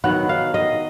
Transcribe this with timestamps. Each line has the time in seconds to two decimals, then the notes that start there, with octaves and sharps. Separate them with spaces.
0.04 D#3 F#3 B3 F#5
0.29 F5
0.54 D#5